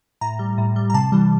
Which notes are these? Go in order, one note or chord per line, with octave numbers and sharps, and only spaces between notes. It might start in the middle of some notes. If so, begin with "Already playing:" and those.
A2 A#5
G3
A2
G3
A#5
C3 A5
E3 G3